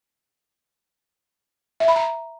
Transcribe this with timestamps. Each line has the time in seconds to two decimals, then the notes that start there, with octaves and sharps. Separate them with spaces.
1.80 E5
1.88 B5
1.96 A#5